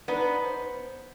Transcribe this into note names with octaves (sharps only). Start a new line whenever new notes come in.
B3 D4 D#4 B4
C5